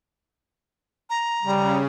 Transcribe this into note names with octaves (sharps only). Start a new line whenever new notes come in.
A#5
C#3 G3